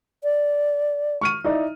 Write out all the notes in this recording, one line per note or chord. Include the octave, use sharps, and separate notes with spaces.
D5
C#6 F6 D#7
D#4 E4 D5